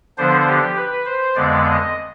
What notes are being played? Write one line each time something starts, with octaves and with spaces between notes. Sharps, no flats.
D3 F3 B3 D4 C5
G4
B4
C5
F2 D3 G#3 B3 D5
D#5